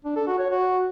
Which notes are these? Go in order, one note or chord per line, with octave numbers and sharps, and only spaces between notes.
D4
A4
F#4
C#5
F#4